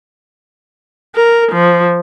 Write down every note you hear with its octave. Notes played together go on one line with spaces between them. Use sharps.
A#4
F3